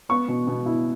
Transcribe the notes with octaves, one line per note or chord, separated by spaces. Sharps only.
B3 C#6
B2
B2
E4